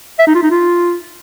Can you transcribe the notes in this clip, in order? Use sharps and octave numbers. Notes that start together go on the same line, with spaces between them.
E5
D#4
F4
D#4
F4